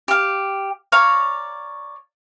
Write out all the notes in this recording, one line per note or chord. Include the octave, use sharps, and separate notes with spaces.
G4 F5
C#5 D5 F5 A#5